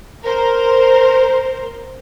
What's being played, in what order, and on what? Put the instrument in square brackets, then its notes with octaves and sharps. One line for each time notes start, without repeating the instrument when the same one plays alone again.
[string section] A#4 C5